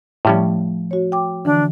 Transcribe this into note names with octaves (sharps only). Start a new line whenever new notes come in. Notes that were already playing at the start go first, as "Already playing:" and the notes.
A2 F3 G3 A3 C#4
F#4 C#5
G5 D6
D3 E3 D4